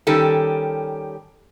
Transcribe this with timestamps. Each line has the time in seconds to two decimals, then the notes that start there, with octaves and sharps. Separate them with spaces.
0.07 D#3 G3 C#4 G4 A4